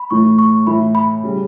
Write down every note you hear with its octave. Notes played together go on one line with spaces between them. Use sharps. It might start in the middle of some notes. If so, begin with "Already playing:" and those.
Already playing: B5
A2 E3 A3 C#6
C#6
A2 E3 A3 E4 B5
B5
C#3 G3